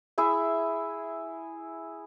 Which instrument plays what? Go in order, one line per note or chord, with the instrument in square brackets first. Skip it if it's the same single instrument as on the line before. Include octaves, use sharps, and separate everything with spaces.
[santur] E4 G#4 E5